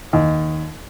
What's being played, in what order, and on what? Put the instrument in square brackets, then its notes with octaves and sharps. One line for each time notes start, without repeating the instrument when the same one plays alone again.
[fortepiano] D#2